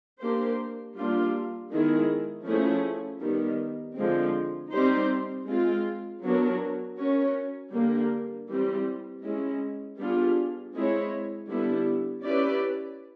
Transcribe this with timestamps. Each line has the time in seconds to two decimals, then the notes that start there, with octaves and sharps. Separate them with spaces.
0.20 A#3 D4 G4 C5
0.95 G3 A#3 D4 F4
1.71 D#3 G#3 B3 E4 G#4
2.46 F3 A3 C#4 E4 G#4
3.21 D#3 G3 B3
3.96 D3 F3 G#3 C4
4.72 G3 C4 D#4 G4 C5
5.47 G#3 C4 F4
6.22 F#3 B3 D4 F#4 A#4
6.97 C#4 F#4 A#4 C#5
7.72 D3 G3 A#3
8.48 E3 G3 C4
9.22 G#3 C#4 E4
9.98 G3 B3 D4 F4 G#4
10.73 G#3 C4 E4 G#4 C#5
11.48 D3 G3 B3 E4
12.23 C#4 E4 G4 B4 D5